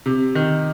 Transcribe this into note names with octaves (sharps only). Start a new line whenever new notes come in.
C3
D#3